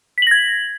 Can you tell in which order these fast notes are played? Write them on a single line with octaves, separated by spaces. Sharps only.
B6 F#7 A#6 G#6